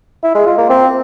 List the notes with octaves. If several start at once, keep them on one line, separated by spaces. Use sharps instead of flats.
E4
G#3
F4
A#3
C4